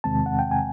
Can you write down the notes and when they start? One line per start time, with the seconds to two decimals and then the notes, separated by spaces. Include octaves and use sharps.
0.04 E2 C3 D#3 G#3 C4 A5
0.26 F#5
0.39 G5
0.51 G#5